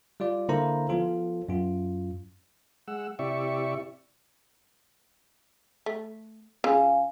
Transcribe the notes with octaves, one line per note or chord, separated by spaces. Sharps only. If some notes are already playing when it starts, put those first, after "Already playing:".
G3 F4 D5
D3 A#3 E4 A4 C5 A#5
F3 B3 F4 A4
F#2 F4
G#3 F#5 E6
C3 E4 G4 D5 E5 C#6
A3
C#3 F4 F5 G#5